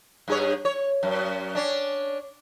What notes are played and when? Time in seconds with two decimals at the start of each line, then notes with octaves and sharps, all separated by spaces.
0.28 G2 G#4 C#5
0.65 C#5
1.03 F#2
1.55 C#4 D4